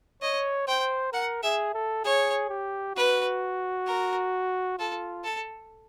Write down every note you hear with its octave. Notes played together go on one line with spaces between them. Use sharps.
C#5 D#5
C5 G5
A#4 F#5
G#4 E5
A4
G#4 C#5
G4
F#4 B4
A#4
F4 A4
A4